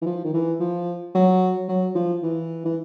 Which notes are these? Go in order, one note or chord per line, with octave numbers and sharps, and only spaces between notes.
E3
F3
D#3
E3
F3
F#3
F#3
F3
E3
E3